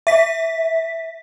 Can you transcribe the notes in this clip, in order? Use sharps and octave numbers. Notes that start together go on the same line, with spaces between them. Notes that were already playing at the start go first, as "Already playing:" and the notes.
E5 B6